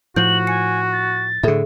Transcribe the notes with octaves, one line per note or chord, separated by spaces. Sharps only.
A2 F3 F#4 G6 F#7
G#5 C#7
A6
A2 D3 G#4 A4 E5